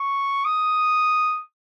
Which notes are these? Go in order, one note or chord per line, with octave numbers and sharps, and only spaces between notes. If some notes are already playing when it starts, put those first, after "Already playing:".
Already playing: C#6
D#6